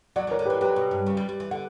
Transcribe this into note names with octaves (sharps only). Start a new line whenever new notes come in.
F#3 D5 F#5
E3 A#4 C#5
D3
E3 G4 B4
F#3 G4 B4
B2
G2
C#3
G3
G3
E3
D3 F#5